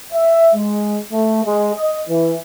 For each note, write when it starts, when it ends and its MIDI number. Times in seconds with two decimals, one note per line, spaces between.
0.13 0.51 76
0.55 0.99 56
1.12 1.42 57
1.45 1.72 56
1.76 2.02 75
2.09 2.37 52